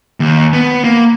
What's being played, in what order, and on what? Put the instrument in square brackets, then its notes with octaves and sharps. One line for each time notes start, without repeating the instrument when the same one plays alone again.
[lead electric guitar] D#2
B3
A#3